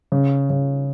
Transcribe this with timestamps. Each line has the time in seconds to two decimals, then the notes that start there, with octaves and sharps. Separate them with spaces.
0.12 C#3
0.50 C#3